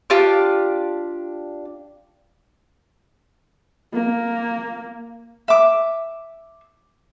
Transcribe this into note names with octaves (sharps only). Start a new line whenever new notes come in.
D4 F4 G4 D6
A#3
E5 D6